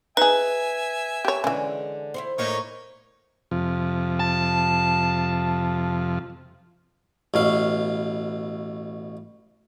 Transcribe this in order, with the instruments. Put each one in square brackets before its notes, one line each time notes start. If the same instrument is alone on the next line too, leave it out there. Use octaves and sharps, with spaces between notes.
[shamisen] D#4 G#4 [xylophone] B4 [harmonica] E5 G#5
[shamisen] G4 C#5
[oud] D3 G#3 [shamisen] E3 C#4
[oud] E4 F#4 C5
[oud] A2 A#3 E4 [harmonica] D#4 C#5
[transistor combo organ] F2 C3 F3
[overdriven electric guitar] A5
[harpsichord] A1 B2 F5